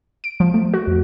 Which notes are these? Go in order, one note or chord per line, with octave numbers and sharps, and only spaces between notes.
D7
F3
A3
F#4
F2